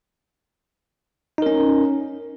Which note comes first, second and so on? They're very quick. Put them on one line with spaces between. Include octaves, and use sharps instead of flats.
D#4 A#4 C#4